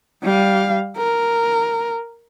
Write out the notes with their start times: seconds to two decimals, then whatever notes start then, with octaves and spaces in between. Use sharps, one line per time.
0.23 G3 F5
0.97 A#4